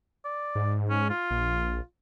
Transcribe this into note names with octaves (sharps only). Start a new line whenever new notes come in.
D5
G#2
C#4
F4
A#1